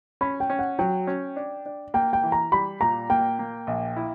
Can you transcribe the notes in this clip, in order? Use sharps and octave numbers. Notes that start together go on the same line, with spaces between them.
C#4 B5
G5
C#4
F#5
F#3 G5
C#4
D4
D4
A#3 G5
G5
E3
A#5
G3 B5
A#2 A#5
A#3 G5
A#3
A#1
E4